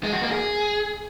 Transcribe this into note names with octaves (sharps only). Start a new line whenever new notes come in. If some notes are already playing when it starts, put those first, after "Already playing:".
G#3
F#4
A#3
G#4